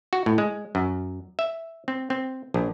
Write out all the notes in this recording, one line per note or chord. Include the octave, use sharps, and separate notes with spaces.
F#4
A2
G#3
F#2
E5
C4
C4
A#1